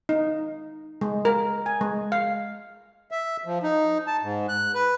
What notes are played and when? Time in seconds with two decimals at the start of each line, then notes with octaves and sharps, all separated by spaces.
0.09 D#4
1.01 G#3
1.25 A#4
1.66 G#5
1.81 G#3
2.12 F5
3.11 E5
3.46 F3
3.63 D#4
4.07 A5
4.22 G#2
4.49 F#6
4.74 B4